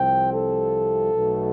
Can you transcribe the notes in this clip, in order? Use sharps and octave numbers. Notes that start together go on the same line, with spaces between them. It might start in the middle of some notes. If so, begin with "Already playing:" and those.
Already playing: C2 C3 F3 C4 G5
A4
B1 B2 A3